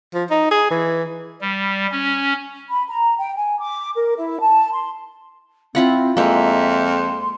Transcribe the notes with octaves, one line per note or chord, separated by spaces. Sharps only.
F3
D#4
G#4
E3
G3
C#4
B5
A#5
G5
G#5
D6
A#4
E4
A5
C6
C4 E4 F4 F#5
F2 G#3 A#3 E5
C6